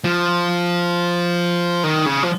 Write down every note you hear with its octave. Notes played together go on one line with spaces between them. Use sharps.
F3
D#3
C#3
F3